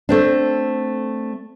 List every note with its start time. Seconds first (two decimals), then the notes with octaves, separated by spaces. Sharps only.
0.09 A3 C4 D4